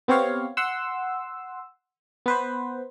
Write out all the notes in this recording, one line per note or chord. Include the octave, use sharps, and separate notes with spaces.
B3 C4 G4 C#5 F5
F#5 C6 E6
B3 B4 C5